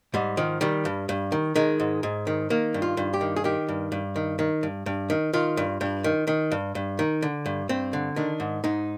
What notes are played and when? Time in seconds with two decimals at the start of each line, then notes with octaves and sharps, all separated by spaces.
0.14 G#2 G3
0.37 D#3 F3
0.61 D#3 G3
0.85 G2
1.09 G2
1.32 D#3
1.55 D#3 G#3
1.80 G#2
2.03 G#2
2.27 D#3
2.50 D#3 A#3
2.74 G2
2.82 F4
2.97 G2
3.14 G4
3.21 D#3
3.36 G#4
3.44 D#3 G4
3.69 G2
3.92 G2
4.16 D#3
4.39 D#3
4.63 G2
4.86 G2
5.10 D#3
5.33 D#3 F4
5.57 G2
5.81 G2
6.04 D#3
6.27 D#3
6.52 G2
6.75 G2
6.99 D#3
7.22 D3
7.46 G2
7.69 G2 C4
7.93 D3
8.16 D#3 D4
8.40 G#2
8.64 G#2 D#4